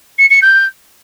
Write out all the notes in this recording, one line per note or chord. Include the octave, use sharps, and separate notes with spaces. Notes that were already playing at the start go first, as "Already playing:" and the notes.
C#7
C#7
G6